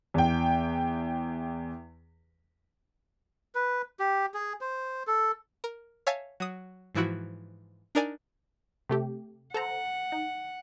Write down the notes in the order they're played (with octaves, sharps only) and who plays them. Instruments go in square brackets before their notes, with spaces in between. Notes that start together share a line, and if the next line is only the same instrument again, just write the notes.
[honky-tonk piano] E2 G5
[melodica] B4
G4
G#4
C5
A4
[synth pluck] A#4
C#5 E5 F5 G#5 A5
F#3 D#6
G#2 E3 F3 E4 F#4
D4 D#4 A#4 D5 G#5
C3 A3 G4
[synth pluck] A4 C5 A#5 [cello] F#5
[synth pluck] D#4